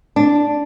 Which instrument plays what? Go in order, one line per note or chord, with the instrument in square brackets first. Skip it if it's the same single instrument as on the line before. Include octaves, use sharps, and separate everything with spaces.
[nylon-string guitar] D4